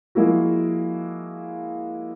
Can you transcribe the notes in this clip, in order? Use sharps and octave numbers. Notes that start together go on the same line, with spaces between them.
F3 G#3 A#3 E4 F#4